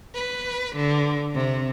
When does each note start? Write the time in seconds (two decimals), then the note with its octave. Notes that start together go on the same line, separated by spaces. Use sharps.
0.15 B4
0.75 D3
1.34 C3